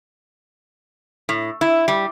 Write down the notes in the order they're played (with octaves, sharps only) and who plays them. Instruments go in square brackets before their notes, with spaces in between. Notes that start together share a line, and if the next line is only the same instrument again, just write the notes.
[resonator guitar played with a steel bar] A2
E4
G3